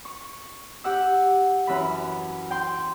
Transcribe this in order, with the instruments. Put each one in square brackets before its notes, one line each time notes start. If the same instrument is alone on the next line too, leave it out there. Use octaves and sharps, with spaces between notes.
[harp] C#6
G4 F#5 E6
F#2 E3 B5
G5 C6